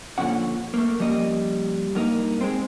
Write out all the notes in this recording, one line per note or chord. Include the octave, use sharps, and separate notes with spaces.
A#2 D3 D#3 F3 C#4 F#5
A3 A#3
F3 G3 A#3 C#4 D#5
G2 A#3 D#4
G#3 C4